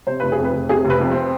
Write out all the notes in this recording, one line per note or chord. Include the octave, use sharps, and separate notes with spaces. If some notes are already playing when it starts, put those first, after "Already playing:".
C3 C5
F1 B4
G#4
F2
B4
F1
C3 G#4
F1
B4
F2
C4